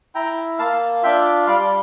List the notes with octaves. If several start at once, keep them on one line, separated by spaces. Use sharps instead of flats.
E4 G5 A#5
A#3 F5 A5
D4 F4 E5 G5
G3 D5 F5